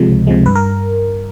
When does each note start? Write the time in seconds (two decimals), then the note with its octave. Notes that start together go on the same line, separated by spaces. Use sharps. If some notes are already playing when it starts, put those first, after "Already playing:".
Already playing: C3 F3 G#3
0.08 C#2
0.27 C3 F3 G#3
0.46 G2 B4
0.55 A#4